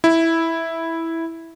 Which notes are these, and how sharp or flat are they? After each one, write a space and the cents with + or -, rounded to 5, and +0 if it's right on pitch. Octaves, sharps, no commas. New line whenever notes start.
E4 -5